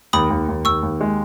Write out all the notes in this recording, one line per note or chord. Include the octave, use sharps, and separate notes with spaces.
D#2 B5 D#6
D#2
D#2
D#2 C#6 E6
D#2
G#3